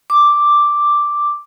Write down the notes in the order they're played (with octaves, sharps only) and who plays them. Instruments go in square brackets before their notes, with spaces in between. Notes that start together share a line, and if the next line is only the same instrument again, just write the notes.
[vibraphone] D6